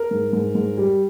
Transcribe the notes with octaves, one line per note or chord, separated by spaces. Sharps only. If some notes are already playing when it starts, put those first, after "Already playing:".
Already playing: A#4
G#2
G#2
G#2
G3